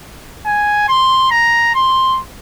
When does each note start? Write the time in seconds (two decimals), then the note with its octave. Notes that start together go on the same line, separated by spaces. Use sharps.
0.46 G#5
0.89 C6
1.31 A#5
1.75 C6